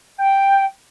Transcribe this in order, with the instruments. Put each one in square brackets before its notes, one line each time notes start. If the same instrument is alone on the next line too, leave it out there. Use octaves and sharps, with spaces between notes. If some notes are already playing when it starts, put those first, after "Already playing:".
[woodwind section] G5